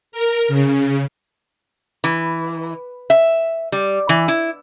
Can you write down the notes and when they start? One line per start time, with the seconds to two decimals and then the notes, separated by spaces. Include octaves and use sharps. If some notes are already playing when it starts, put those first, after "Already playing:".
0.12 A#4
0.48 C#3
2.04 E3
3.10 E5
3.72 G3
4.09 E3
4.28 E4